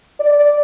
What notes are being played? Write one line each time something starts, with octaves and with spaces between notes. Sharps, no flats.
D5